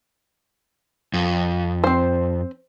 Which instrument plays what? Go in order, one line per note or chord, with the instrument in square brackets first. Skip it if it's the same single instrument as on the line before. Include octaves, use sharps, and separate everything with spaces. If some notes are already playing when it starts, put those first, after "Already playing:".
[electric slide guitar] F2
[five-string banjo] C4 C5